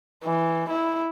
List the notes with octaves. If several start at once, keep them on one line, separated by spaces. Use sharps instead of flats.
E3
E4